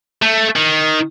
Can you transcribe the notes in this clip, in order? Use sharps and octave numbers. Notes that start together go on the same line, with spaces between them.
A3
D#3